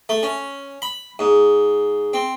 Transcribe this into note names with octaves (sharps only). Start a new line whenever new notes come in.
A3
C#4
B5
G#2
C4